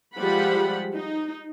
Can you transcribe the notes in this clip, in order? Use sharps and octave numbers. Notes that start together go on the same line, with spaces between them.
F3 G3 G#3 G4 F#5 B5
D#4